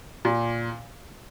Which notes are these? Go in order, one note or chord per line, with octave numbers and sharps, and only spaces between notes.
A#2